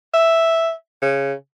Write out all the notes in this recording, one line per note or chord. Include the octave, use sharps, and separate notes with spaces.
E5
C#3